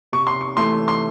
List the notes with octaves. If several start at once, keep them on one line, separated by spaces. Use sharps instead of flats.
C3 C#6
C6
C#6
E3 A3 C6
C6